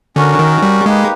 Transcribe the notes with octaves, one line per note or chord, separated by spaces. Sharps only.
D3 C#4 F#4 A#4
D#3
G3
G#3 A#3 D#4 G4 B4